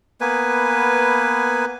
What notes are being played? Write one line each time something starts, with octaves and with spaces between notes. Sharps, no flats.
A#3 B3 B4 G#5